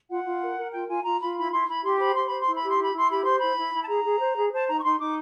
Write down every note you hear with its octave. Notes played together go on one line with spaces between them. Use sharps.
F4 F#5
F4
A#4
A#4
F4 G5
F4 G#5
F4 A#5
F4 B5
E4 B5
E4 C6
E4 B5
G4 C6
C5 B5
G4 C6
C5 B5
C6
E4
B5
G4
C6
E4 B5
E4 C6
G4 B5
C5 C6
E4 B5
E4
E4
A5
G#4 A#5
G#4
C5
G#4
C5 A5
D#4 A#5
C#6
D#4 C6
D#4 D6